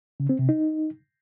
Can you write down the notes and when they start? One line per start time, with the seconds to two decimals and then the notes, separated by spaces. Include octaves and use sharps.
0.20 C#3
0.29 C4
0.39 C3
0.49 D#4